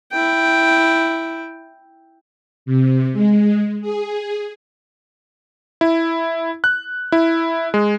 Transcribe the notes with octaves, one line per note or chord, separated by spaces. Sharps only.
E4 G5
C3
G#3
G#4
E4
F#6
E4
G#3